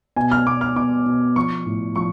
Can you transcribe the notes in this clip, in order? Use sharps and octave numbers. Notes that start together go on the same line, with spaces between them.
B2 G#5
F6
B2 D6
F6
B2 D6
B2
F3 C#6
A2
F3 C#6